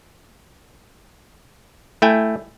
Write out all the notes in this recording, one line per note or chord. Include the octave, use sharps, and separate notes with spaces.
A3 E4 G5 G#5